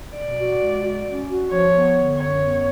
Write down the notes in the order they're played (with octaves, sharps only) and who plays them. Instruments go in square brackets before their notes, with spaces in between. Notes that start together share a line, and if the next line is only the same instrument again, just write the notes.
[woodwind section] B2 [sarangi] D5
[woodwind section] F#4
G#3
F#4
C#4
F#4
[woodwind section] F3 [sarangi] C#5
[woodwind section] B3
D3
[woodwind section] F#2 [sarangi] C#5
[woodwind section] B3